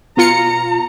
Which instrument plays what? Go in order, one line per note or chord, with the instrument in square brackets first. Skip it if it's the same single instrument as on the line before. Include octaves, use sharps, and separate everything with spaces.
[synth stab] B2 F4 C#7 [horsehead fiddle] A#5